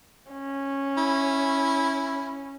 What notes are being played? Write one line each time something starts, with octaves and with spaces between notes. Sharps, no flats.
C#4
E4